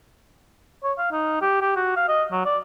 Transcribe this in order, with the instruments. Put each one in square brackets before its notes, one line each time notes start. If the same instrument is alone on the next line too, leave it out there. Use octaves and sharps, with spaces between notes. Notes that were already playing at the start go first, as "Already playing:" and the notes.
[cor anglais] C#5
F5
D#4
G4
G4
F#4
F5
D#5
F#3
D5